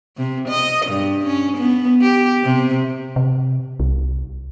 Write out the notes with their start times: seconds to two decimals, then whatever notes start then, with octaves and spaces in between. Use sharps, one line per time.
0.17 C3
0.49 D#5
0.86 G2
1.26 C#4
1.58 B3
2.01 G4
2.44 C3
3.16 C3
3.80 C2